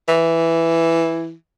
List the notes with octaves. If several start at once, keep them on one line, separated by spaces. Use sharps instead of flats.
E3